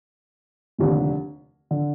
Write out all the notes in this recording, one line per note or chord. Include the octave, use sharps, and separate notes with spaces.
F1 D#2 D3
D3